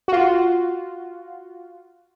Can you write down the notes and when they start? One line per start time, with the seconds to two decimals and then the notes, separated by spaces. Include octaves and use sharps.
0.08 F4 F#4